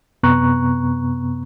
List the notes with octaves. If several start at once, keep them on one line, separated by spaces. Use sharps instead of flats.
F#2 C3 B3 A#5 C#6 F#6